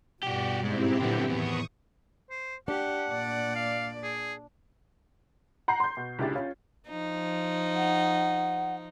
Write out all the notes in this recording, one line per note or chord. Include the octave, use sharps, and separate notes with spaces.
G2 B2 F#4 G4 D5
G#2 G#3 C4 E4 G4
A#2 D3 F#3 B3
E2 A2 D#3 B3 C#6 D#6
C5
D4 G4 F#5
A#2 D5
F5
G#4
F#5 A#5 G6 C7
C6 G6
B2
C#2 A#2 D4 E4 G4 A6
C#4 F4
F3 D#4
F#5